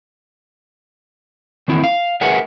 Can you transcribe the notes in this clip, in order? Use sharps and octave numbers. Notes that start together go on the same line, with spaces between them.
D#3 E3 C4 E4
F5
G#4 A#4 B4 E5 F#5 G#5